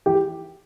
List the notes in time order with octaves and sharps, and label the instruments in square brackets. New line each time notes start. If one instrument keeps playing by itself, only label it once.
[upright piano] E3 G4 G5